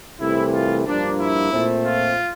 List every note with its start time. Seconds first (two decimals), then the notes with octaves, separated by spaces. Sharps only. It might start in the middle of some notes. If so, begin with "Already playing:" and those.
0.20 C2 C3 E3 A3 E4
0.52 F4
0.85 G2 F3 A#3 D4
1.18 E4
1.51 A#2 A3 C4
1.84 F4